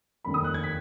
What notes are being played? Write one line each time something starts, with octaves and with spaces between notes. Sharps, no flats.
F1 D#2 D#3 B5
D#6
F#6
G#6
B6